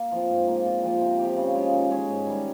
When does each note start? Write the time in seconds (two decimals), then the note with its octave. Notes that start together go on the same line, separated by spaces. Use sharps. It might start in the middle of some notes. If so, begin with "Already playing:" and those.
Already playing: A#3
0.12 F3 C4
0.30 G#2
0.48 F3 A#3
0.65 A#2
0.83 F3 C4 G4
1.01 C3
1.19 F3 C4 G4
1.37 C#3
1.55 F3 G#3
1.73 D#3
1.91 G#3 C#4 G#4
2.09 G#2
2.26 D#3 G3